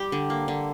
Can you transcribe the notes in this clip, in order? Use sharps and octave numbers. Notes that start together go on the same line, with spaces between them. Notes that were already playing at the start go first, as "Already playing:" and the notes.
Already playing: G3 G4
D3
A#3
D3